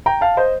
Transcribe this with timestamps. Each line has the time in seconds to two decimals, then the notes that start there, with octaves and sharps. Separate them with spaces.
0.06 G5 A#5
0.21 F5 A5
0.37 C5 D#5